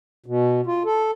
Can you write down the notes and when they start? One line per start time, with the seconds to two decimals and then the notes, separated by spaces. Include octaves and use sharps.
0.26 B2
0.66 F4
0.85 A4